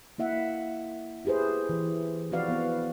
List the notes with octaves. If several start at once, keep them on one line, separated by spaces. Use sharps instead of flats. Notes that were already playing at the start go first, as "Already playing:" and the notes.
A#3 E4 E5 F#5
E4 G4 G#4 B4 C5
E3
F3 C4 F#4 B4 D5 F5
B3